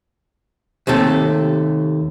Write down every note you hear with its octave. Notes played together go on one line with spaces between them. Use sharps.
D#2 C3 A3 A4